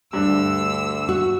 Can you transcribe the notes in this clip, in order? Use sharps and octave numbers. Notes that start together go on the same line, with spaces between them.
D2 G2 D4 E6
F#4